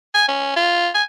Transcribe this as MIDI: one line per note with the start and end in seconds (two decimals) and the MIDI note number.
0.14 0.27 80
0.28 0.55 61
0.56 0.89 65
0.94 1.03 80